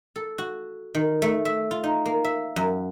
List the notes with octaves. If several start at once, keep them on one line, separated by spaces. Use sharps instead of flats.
A4
F#4
D#3
A3
E5
F4
D#4
A#3
E5
F#2